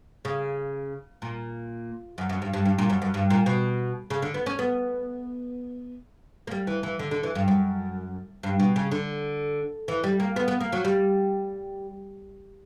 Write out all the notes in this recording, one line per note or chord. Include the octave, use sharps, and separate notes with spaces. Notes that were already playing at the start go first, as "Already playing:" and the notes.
C#3
A#2
F#2
F#2
G2
G2
G2
A#2
F#2
F#2
G2
A#2
B2
C#3
D3
B3
C#4
B3
A#3
G3
E3
E3
D3
D3
E3
G2
F#2
G2
B2
C#3
D3
E3
G3
A#3
B3
B3
A#3
F#3
G3